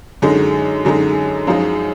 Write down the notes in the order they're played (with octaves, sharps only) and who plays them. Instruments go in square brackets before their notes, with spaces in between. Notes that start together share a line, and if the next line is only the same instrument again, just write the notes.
[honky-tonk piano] F#2 D3 G#3 D#4
F#2 D3 G#3 D#4
F#2 F3 G#3 D#4